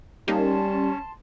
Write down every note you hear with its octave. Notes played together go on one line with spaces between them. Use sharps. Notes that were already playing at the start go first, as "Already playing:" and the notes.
G3 A#3 C#4 D#4 G4 A5 C6